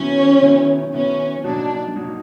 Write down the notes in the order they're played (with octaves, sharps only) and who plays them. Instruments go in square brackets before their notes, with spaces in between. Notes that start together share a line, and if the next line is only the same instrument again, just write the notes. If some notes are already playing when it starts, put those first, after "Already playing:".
Already playing: [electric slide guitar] D#3 F#3 B3 E4 [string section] C#4
[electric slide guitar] D#3 F#3 B3 E4
[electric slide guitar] D#3 F#3 B3 E4 [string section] C#4
[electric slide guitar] F#3 A#3 D#4 F#4 [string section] D4
[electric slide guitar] F#3 A#3 D#4 F#4